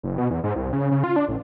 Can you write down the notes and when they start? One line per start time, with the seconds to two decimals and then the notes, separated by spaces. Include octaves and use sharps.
0.03 F#1
0.18 B2
0.30 E2
0.44 G#2
0.56 C2
0.73 C#3
0.91 C#3
1.04 F4
1.16 D4
1.28 A1